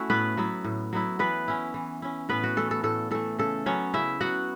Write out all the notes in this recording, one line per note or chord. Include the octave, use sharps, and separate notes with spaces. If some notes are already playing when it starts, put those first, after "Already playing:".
Already playing: A3 C#4 E4 F#4
A2 B3 B4
F#3 B3 E4
A2
F#3 B3 E4
E3 B3 B4
C#4 E4
E3
C#4 E4
A2 B3 B4
F#4
E3 A3 A4
A4
A2 A4
E3 A3 A4
C#3 A4
F#3 B3 C#4 C#5
C#3 E4 E5
F#3 B3 F#4 F#5